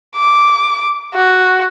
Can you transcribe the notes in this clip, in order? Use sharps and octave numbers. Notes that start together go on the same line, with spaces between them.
D6
F#4